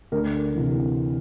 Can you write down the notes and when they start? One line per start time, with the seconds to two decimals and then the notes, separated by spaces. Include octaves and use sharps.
0.12 D2 A#4
0.55 C3 E3